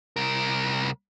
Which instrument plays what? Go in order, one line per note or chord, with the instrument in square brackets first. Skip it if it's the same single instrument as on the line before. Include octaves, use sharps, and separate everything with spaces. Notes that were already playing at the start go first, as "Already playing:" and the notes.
[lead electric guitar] C2 A#4